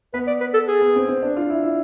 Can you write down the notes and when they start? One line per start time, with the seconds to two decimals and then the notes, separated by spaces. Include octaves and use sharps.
0.14 B3 B4
0.27 D5
0.41 B4
0.54 A4
0.68 G#4
0.81 B3
0.96 C4
1.08 C4
1.22 D4
1.37 F4
1.50 E4
1.63 E4